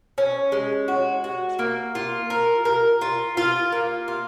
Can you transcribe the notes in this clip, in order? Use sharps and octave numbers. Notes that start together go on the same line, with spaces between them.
C#4
G#3
F#4
F#4
A#3
F4
A#4
A#4
F4
F4
A#3
F4